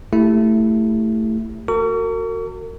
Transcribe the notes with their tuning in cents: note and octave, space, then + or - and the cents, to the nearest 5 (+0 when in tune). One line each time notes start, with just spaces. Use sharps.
A3 +15 E4 +0 G4 +20
F#4 +0 A#4 -40 C#6 +40